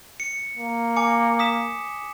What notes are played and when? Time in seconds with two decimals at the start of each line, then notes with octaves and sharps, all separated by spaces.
0.20 C#7
0.57 A#3
0.96 G#5 D6 C#7
1.39 D#6 B6 E7